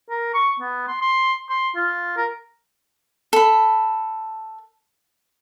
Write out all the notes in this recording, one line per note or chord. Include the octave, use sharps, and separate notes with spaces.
A#4
C#6
B3
C6
C6
C6
F4
A#4
A4 B5